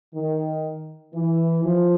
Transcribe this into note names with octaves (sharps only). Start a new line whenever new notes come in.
D#3
E3
F3